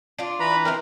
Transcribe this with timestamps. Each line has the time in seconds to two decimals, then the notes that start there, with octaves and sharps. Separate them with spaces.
0.19 D4 F4
0.40 E3 B4 A#5 B5
0.65 C4 D#4 E4 A#4